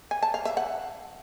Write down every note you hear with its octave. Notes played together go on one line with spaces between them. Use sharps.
G#5
A5
F5
E5
F#5